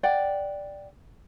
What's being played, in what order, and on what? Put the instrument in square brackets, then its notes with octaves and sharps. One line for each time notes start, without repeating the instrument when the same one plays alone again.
[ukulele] D5 F#5 G5